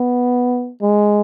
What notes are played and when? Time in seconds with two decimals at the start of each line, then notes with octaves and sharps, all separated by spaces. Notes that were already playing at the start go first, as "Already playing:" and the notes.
Already playing: B3
0.82 G#3